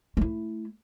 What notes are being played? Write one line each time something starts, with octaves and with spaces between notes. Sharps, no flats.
A3 E4